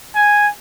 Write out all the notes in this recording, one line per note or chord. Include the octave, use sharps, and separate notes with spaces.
G#5